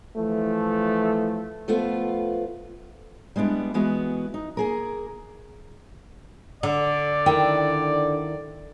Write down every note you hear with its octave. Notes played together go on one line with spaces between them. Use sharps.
E3 F3 A3
F3 A3 B3 F4
G3 G#3 B3 D4 E4
E3 G#3 B3 E4 F#4
D#4
A#3 G#4 A#4
D3 D5
D#3 E4 G5